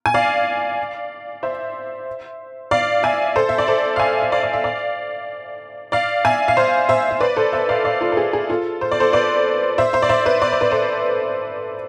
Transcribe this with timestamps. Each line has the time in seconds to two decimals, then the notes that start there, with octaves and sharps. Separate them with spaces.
0.06 G#5
0.14 D5 F5
1.43 C5 E5
2.71 D5 F5
3.03 E5 G#5
3.36 A4 C5
3.49 E5
3.58 D5
3.68 A4 C5
3.96 F5
4.00 E5 G#5
4.22 E5
4.32 D5 F5
4.43 D5
4.53 E5
4.64 D5 F5
5.92 D5 F5
6.25 E5 G#5
6.48 F5
6.57 C5 E5
6.89 C5 E5
7.11 E5
7.20 B4 D5
7.37 A4 C5
7.53 C5 E5
7.69 D5 F5
7.84 D5 F5
8.01 F4 A4
8.12 A4
8.17 G#4
8.33 G#4
8.50 F4 A4
8.81 C5
8.92 D5
9.00 A4 C5
9.13 B4 D5
9.78 C5 E5
9.93 C5 E5
10.02 D5
10.09 C5 E5
10.26 B4 D5
10.42 D5
10.52 C5
10.61 B4
10.71 A4 C5